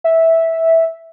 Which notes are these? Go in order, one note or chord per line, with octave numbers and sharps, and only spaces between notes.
E5